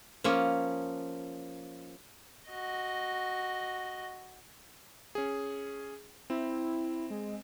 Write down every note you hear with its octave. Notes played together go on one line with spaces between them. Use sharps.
F3 A#3 C#4
F#4 D#5
C#4 G#4
C4 E4
G#3